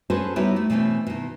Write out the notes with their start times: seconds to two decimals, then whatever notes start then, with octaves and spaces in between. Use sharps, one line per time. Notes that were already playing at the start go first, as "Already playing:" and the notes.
0.10 C#4 F#4 G#4 A4 B4 C5
0.36 G3 B3 D#4 E4 F#4 C#5
0.56 A3
0.70 B2 E3 A3 C4 C#4
1.07 B2 D#3